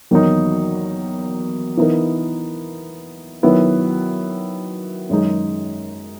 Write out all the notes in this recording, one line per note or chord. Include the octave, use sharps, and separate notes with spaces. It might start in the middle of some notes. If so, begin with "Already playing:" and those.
E2 D#3 F#3 A#3 D#4
E3 B3 D#4 A#4
D#3 F#3 B3 E4 B4
F#2 D#3 G#3 D#4 G#4